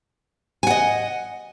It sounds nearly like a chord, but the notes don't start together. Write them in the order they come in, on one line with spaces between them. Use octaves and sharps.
G#5 F#5 D#5